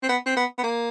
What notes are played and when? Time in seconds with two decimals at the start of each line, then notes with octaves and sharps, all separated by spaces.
0.03 C4
0.09 B3
0.26 C4
0.36 B3
0.58 B3
0.64 A#3